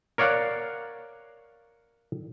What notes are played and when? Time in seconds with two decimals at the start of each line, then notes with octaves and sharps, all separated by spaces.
0.18 A#4 C#5 D5 F5 F#5